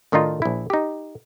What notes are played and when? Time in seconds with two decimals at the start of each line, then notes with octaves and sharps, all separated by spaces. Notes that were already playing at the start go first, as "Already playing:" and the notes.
0.12 A2 D#3 D4 D#4 F4
0.42 A#1 E4
0.70 D#4 G4